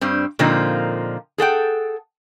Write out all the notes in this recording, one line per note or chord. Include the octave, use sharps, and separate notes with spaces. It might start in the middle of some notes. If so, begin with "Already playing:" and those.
G2 G3 C4
A#2 D3 F3 A#3 C4 D#4
G#4 A4 F#5 G5